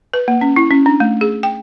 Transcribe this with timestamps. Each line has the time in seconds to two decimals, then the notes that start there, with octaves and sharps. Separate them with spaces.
0.13 B4
0.28 A#3
0.41 C#4
0.56 E4
0.71 C#4
0.86 D4
1.00 A3
1.21 G#4
1.43 G5